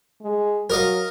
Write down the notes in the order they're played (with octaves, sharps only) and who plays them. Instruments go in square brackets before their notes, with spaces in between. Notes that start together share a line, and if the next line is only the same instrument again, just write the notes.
[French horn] G#3
[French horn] F#3 [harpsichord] A#4 D#5 F5